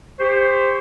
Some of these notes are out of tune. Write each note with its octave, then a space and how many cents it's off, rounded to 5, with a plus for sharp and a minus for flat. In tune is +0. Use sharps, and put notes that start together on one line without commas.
G4 +30 C5 +0 C#6 +20